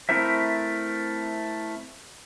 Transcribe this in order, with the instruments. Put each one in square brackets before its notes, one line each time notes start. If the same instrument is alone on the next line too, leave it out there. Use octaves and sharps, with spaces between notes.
[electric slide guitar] A3 C4 E4 A#4 C5 E5